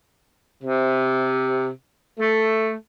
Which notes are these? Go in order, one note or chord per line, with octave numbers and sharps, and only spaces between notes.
C3
A3